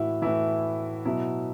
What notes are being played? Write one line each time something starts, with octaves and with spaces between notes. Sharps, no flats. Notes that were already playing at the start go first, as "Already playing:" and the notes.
Already playing: A2 E3 E4 F#4
A2 E3 E4
B2 F#3 E4